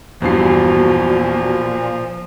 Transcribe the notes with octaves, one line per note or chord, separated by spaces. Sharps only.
E2 G2 A#2 F3 F#4 C7